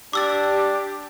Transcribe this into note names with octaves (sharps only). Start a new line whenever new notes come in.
D4 G4 D6 E6 A6